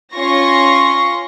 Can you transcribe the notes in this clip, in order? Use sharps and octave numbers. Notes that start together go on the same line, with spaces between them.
C#4 F4 C6 C#6 A#6